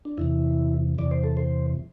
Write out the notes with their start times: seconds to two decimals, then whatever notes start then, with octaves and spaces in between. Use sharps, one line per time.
0.05 D4
0.18 E2 C3 E3 E4
0.98 E2 C3 E3 D5
1.11 C5
1.23 A4
1.37 C5